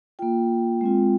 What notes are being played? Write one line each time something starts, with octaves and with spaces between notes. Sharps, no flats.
A#3 F4 G5
G#3 C4 F4